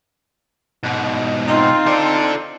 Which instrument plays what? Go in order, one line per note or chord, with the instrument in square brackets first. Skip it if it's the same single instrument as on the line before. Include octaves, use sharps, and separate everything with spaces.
[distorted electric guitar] G#2 B2
[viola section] C4 F4 [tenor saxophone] D#4
[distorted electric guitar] A4 D5